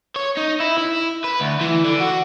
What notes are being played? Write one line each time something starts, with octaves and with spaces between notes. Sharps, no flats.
C#5
D#4
E4
E4
B4
D2
E3
D3
F#4